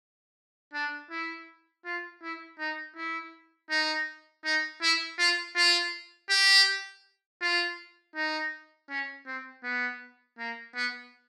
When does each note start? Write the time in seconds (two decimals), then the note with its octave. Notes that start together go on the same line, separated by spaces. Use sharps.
0.73 D4
1.10 E4
1.85 F4
2.22 E4
2.59 D#4
2.96 E4
3.70 D#4
4.44 D#4
4.82 E4
5.18 F4
5.55 F4
6.30 G4
7.41 F4
8.16 D#4
8.90 C#4
9.26 C4
9.64 B3
10.38 A#3
10.75 B3